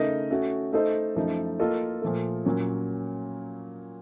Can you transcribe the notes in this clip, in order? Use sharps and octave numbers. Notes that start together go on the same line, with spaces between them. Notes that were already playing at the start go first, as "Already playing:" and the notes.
Already playing: C#3 A3 D#4 A#4 D#5
A3 C#4 F#4
A3 D#4 A4 C5 D#5
F#2 F3 A3 D#4
A#3 F4 A4 D#5
A#2 F3 A3
A#2 F#3 A#3 C#4